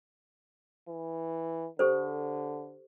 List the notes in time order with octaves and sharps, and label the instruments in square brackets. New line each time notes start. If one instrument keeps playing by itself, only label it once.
[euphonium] E3
[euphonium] D3 [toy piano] G4 A4 C5